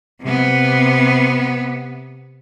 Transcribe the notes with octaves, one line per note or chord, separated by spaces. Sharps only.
C3 B3